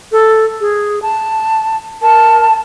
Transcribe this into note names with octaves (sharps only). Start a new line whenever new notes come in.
A4
G#4
A5
A#4 A5